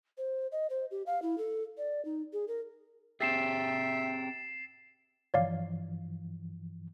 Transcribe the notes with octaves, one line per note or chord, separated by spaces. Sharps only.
C5
D#5
C5
G4
F5
E4
A4
D5
D#4
G#4
A#4
C4 G4 G#4 E5 G5 A6 C7 E7
G2 E3 F3 C#5 D5 F5